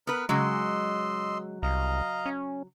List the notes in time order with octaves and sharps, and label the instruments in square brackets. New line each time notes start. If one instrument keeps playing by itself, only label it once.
[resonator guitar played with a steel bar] B3 B4 [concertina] A#4 F6
[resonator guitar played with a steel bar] C#3 F#3 [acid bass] G#3 [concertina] D#5 C6 E6
[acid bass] C2 [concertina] D#5 F5 A#5
[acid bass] C#4